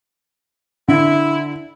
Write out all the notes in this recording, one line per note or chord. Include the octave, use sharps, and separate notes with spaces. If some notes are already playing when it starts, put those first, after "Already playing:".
D3 E4